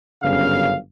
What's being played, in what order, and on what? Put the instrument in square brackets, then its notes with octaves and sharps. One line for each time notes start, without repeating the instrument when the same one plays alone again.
[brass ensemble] G1 F#2 C#3 F5